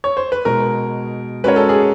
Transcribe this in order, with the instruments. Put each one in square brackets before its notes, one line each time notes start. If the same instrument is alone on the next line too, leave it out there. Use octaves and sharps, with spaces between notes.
[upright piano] C#5
C5
B4
[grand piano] B2 G#3 B3 D#4 [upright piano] A#4
[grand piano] G#3 C#4 F#4 A#4 C#5 [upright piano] B4
[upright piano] A4
G#4